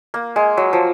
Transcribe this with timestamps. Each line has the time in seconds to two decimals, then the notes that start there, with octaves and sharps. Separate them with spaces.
0.14 A#3
0.36 G#3
0.57 F#3
0.73 F3